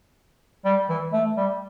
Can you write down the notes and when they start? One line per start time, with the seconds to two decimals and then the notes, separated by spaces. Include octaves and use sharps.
0.65 G3
0.89 E3
1.13 A3
1.37 G3